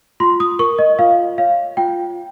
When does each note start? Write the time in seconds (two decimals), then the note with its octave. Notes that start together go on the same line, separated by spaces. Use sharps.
0.20 F4 C6
0.40 D#6
0.59 A#4 C#6
0.79 D#5
0.99 F4 F5
1.38 C#5 F5
1.77 F4 G5